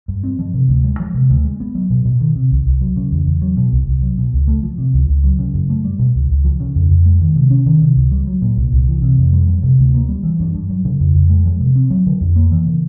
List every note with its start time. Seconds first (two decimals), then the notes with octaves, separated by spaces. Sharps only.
0.08 G2
0.23 C4
0.39 F3
0.54 C3
0.69 D2
0.84 G#3
1.00 F3
1.14 C3
1.30 D2
1.45 G#3
1.60 B3
1.75 F#3
1.90 B2
2.05 B2
2.20 D#3
2.36 C3
2.51 C2
2.65 C2
2.81 F#3
2.96 C#3
3.11 E2
3.27 E2
3.42 F#3
3.57 B2
3.72 C2
3.87 C2
4.02 F#3
4.18 B2
4.33 C#2
4.48 A3
4.63 F3
4.78 C3
4.94 C#2
5.09 C#2
5.24 F#3
5.39 C#3
5.54 F#2
5.69 A3
5.84 G3
5.99 B2
6.15 C#2
6.30 C#2
6.45 F3
6.60 C#3
6.75 F2
6.90 F2
7.05 G#3
7.21 D#3
7.36 C3
7.50 C#4
7.66 D#3
7.82 C3
7.96 C#2
8.12 G3
8.27 F#3
8.42 A#2
8.57 C2
8.72 C2
8.88 E3
9.02 C3
9.18 F2
9.33 G3
9.48 F3
9.63 C3
9.79 D2
9.94 A#3
10.09 G3
10.23 E3
10.40 G2
10.55 G2
10.69 F#3
10.85 C#3
11.00 F2
11.15 F2
11.30 G#3
11.46 F3
11.60 C3
11.76 C4
11.90 F#3
12.06 D3
12.21 F2
12.36 A#3
12.51 E3
12.67 C#3